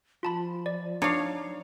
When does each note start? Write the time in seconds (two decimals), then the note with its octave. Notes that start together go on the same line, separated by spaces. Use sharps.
0.23 F3 F4 A5 B5
0.66 D5
1.02 D4 D#4 C#5 F5